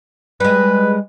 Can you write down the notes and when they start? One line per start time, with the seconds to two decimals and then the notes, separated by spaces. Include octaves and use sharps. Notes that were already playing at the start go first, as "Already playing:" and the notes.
0.40 G3 G#3 B4